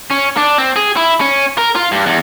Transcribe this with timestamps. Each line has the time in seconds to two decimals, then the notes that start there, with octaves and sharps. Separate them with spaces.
0.11 C#4
0.37 D4
0.58 C4
0.76 G#4
0.97 E4
1.21 C#4
1.58 A#4
1.75 F4
1.92 G2
2.06 E2